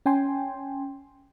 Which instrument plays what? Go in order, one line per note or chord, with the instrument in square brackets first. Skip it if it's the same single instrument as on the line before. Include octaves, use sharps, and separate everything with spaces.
[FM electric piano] C#4 G5 G#5 C6